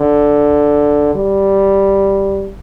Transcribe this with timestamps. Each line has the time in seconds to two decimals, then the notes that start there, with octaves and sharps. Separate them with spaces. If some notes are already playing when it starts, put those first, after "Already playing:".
Already playing: D3
1.15 G3